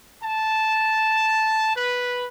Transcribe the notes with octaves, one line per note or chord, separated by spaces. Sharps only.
A5
B4